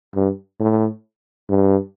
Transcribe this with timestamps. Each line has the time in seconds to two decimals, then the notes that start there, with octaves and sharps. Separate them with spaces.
0.15 G2
0.60 A2
1.49 G2